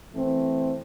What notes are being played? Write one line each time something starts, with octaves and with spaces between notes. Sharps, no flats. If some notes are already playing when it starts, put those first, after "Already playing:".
E3 A3 C4